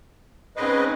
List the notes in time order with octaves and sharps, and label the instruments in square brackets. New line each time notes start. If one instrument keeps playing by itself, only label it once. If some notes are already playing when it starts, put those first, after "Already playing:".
[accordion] G#2 B4 D#5 [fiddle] C4 C#4